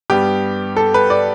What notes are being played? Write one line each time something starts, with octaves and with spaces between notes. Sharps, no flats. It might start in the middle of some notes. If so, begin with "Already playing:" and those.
G2 G3 B3 G4
A4
B4
D5